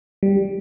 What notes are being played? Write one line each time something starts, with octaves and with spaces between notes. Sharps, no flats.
G3